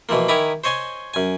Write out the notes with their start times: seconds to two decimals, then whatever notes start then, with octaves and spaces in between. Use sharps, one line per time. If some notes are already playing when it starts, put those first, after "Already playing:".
0.09 B2 E3 F3 A#3
0.28 D#3 E4 G#5 A#5 B5 D6
0.64 C5 C#5 D#5 G#5 C6
1.14 F#2 G#5